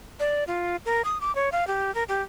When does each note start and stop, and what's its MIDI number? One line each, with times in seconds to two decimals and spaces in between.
0.20 0.44 74
0.47 0.76 65
0.85 1.02 70
1.05 1.18 87
1.21 1.34 86
1.35 1.49 73
1.52 1.67 77
1.67 1.93 67
1.95 2.04 70
2.09 2.22 67